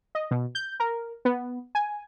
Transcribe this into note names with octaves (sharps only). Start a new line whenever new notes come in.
D#5
B2
G6
A#4
B3
G#5